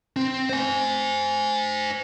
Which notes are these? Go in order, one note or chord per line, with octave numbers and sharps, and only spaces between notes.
C4
C5 G#5